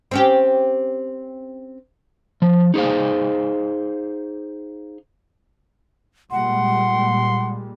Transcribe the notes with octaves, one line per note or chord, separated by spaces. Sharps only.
C4 C#4 G4
F3
D#4 G#4 C5 F5
A#2 G3 G#3 F#5 C6